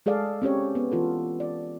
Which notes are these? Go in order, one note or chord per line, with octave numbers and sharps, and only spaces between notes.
G#3 G#4 A4 D5 F5
C4 C#4 G4 C#5
B3
E3 F4 A4
D5